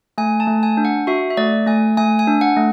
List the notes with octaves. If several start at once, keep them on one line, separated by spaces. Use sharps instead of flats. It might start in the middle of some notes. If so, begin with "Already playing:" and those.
A3 G#5
A5
A3
G#5
D4
F#5
F#4 E5
E5
A3 D5
A3 G#5
A3 G#5
G#5
D4
F#5
A3